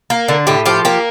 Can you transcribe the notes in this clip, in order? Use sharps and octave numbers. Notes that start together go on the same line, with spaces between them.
A#3
D3
A2 G4
F3 G4
A#3 G4